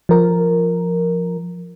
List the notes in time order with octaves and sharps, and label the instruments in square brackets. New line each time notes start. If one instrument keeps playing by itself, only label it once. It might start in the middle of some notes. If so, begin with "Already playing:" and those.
[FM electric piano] F3 A#4